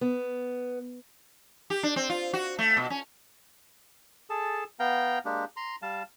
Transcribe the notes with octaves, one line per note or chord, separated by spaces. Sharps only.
B3
G4
D4
C4
F4
F#4
A3
B2
C#4
G#4 A4 A5
B3 F5 G5 A#5
G#3 A#3 D4 G4
A#5 C6
G3 F5 A5